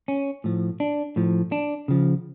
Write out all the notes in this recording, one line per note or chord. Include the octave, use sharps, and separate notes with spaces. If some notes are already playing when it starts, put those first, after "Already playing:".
C#4
A2 F3
D4
A2 F3
D4
C#3 F3